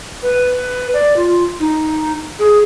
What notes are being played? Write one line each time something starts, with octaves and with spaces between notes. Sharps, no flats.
B4
D5
F4
D#4
G#4